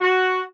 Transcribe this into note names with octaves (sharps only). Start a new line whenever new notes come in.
F#4